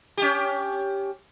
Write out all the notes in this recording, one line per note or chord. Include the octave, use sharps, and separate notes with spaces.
C#4 G4